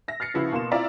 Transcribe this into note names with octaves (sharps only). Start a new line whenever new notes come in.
E5 A#6
F6 A6 C7 C#7
C#3 F3 E4 F#4 B4
B2 A#3 C6 E7
C4 E4 F4 D5 E5 A#5